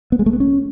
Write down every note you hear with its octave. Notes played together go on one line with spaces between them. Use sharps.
B3
G#3
A3
B3
C#4